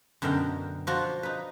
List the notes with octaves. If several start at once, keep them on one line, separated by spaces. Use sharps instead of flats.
F#2 B2 D3 A#4 G5
F3 D4 F4 F#4
D#4 B4